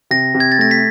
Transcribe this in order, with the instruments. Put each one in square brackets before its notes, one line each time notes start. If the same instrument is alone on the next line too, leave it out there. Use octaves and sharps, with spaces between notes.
[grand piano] C3 [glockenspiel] A#6
[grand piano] C3
[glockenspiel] G#6
A6
[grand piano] A3 [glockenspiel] A#6
[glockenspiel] B6